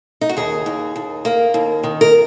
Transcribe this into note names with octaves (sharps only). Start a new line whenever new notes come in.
D#4
F#4
D#2 G#4
D#2
D#2
A#3
D#2
D#3
A#4